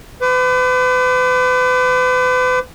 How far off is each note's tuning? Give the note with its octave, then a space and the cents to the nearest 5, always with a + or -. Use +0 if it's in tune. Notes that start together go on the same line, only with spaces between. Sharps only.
B4 +40 D6 +0